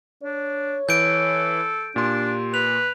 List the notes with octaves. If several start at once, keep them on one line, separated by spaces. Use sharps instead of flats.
D4 C#5
E3 A4 G6 D7
A#2 D4 G4 C6
B4 F7